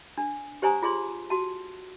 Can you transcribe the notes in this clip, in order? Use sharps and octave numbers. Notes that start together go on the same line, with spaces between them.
D4
G4 C5 C#5 G#5 A#5 D#6
F4 G#4 C#5 C6
F#4 A5